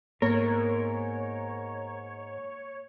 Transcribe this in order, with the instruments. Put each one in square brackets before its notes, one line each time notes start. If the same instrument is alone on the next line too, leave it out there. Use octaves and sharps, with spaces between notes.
[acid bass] G#2 [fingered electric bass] A#3 B3 [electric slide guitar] A#4 [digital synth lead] C#5